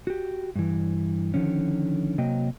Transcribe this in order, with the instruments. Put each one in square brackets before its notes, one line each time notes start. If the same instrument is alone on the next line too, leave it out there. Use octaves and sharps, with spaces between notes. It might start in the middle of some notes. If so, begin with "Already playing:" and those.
[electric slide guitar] F#4 G4
G2 E3
D3 D#3 F3 C#4
C3 F#3 A#3 D#5 G5